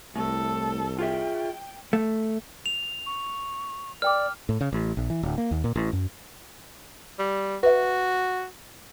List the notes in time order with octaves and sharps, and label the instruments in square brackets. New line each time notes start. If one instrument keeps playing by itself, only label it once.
[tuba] C2 [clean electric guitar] A2 [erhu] A4
[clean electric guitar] F4 G#4 E5 [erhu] G5
[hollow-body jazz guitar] A3
[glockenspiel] F7
[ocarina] C#6
[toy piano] A#4 G5 D6 [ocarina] D5 [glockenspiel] F6
[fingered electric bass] A2
C#3
A1
A#1
E3
D1
A#3
D#2
A#2
A1
F#2
[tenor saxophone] G3
[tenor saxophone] F#4 [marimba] B4 E5